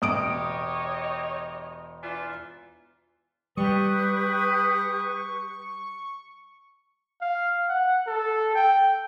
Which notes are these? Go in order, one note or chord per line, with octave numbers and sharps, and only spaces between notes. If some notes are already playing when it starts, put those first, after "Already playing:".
E1 G4 C#5 D#5 D#6 D7
E3 D4 F4
G3 G4 B4 C#6 D#6
F5
F#5
A4
G5